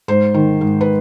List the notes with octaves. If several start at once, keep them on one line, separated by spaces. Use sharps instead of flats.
G#2 C5
D#3
G#2
B4